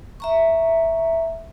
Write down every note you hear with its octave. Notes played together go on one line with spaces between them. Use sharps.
E5 A#5 C#6